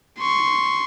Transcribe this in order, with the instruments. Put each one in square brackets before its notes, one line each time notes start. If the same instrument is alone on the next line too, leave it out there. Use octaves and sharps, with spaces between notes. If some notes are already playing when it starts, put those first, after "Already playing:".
[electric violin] C6 C#6